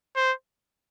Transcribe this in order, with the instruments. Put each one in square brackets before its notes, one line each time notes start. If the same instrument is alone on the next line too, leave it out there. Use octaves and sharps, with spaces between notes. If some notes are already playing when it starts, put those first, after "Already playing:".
[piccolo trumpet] C5